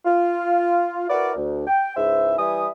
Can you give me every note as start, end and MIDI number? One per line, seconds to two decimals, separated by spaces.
0.06 1.05 65
1.10 1.35 64
1.10 1.35 66
1.10 1.35 70
1.10 1.35 71
1.10 1.35 74
1.36 1.65 38
1.67 1.95 79
1.97 2.35 37
1.97 2.35 44
1.97 2.35 64
1.97 2.35 72
1.97 2.35 76
2.39 2.68 52
2.39 2.68 55
2.39 2.68 76
2.39 2.68 80
2.39 2.68 87